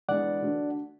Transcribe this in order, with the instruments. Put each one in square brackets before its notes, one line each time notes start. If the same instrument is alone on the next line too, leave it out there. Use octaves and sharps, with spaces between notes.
[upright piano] E2 D3 G#3 B3 [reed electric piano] D5 F#5
[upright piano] D3 A3 D4 F#4